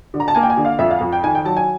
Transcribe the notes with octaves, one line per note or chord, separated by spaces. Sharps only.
D3
A#5
A5
A#3 G#5
G5
G#5
D3
F5
F2 E5
F5
F2
G5
D#3 G#5
G5
F#3 A5
G#5